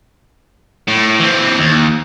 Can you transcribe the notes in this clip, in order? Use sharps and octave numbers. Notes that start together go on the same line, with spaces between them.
A2
E3 C4
D#2